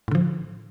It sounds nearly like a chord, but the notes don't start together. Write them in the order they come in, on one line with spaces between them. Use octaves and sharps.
A2 D3 F3